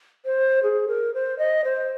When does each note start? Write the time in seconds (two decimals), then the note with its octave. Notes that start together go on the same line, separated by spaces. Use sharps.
0.25 C5
0.63 G#4
0.88 A#4
1.14 C5
1.39 D#5
1.64 C5